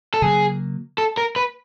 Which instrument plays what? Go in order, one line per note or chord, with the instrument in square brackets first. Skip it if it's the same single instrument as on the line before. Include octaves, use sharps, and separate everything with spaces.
[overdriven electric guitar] A4
[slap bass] C#3 F#3 A#3 [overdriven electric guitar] G#4
[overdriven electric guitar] A4
A#4
B4